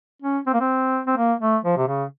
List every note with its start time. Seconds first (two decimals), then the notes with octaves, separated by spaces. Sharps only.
0.22 C#4
0.47 C4
0.53 A#3
0.61 C4
1.07 C4
1.17 A#3
1.40 A3
1.64 F3
1.77 C3
1.88 C#3